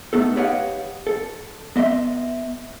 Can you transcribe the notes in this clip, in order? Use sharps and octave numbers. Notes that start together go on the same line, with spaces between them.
A3 B3 D#4 A4
G4 B4 C#5 D#5 F5 F#5
A4
B3 D#5 E5 C6